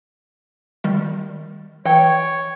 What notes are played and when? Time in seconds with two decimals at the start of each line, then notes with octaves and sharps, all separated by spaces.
0.84 D#3 G3 D#5
1.85 E3 C#5 G5